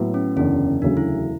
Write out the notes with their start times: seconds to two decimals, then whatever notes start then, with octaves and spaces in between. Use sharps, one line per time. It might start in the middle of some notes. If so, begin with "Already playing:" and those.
Already playing: A2 F#3 B3
0.14 C#4
0.36 F#1 E2 D3 C#4
0.82 E1 D2 C#3 F#3 A3 D4
0.97 E4